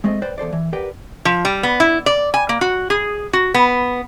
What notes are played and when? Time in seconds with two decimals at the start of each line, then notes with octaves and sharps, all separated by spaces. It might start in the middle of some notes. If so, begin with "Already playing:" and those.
0.04 G#3 A3 C4 D#5
0.22 B4 C5 D5 G5
0.38 E2 A4 C5 D5
0.53 E3
0.73 G4 A#4 B4 D5 F#5 G5
1.25 F3
1.45 G3
1.63 B3
1.80 E4
2.06 D5
2.34 G#5
2.49 A#3
2.61 F#4
2.90 G#4
3.33 F#4
3.54 B3